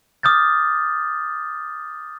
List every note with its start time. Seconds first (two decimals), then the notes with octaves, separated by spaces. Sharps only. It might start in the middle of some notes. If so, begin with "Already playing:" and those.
0.23 D6 D#6 F6 G6 A6